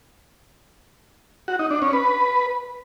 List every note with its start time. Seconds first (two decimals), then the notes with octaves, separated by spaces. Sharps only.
1.48 F#4
1.59 D#4
1.71 D4
1.82 C#4
1.93 B4